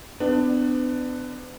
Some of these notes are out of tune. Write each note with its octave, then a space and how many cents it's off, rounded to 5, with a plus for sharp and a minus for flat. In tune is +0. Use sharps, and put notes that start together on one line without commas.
B3 +40 D4 +15